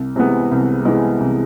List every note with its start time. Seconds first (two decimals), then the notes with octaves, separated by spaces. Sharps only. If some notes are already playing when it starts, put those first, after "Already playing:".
Already playing: C2
0.16 C3 E3 G#3 B3
0.51 C2
0.85 C3 E3 G#3 B3
1.20 C2